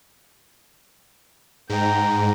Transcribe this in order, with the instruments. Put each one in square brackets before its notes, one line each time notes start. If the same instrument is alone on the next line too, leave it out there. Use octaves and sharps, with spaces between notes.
[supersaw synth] G#2 [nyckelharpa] G5 A#5